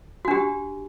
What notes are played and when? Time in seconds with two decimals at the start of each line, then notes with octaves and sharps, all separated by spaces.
0.25 F#4
0.28 D4
0.31 G4